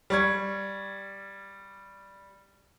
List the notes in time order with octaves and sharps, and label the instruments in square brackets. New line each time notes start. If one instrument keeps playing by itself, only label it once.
[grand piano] G3 C#6 G#6